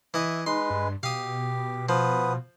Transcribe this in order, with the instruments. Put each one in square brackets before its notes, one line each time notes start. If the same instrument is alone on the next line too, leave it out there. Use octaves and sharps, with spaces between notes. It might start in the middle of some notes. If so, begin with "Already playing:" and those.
[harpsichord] E3 D#5 [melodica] E5
[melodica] G#3 B4 [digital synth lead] D#4 [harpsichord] C6
[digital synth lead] G2
[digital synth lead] B2 [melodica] G4 [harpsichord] F5 D#6
[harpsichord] F3 [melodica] B3 B4 D#6